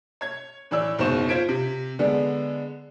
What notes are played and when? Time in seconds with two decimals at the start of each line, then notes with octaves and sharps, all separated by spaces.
0.21 C#5 G#6
0.71 A2 E3 C#5 D5 E6
0.99 F#1 G#2 B2 C5 C#6 E7
1.29 F4 C5 G#6 B6 D7
1.49 C3
1.99 D3 G#3 B3 D4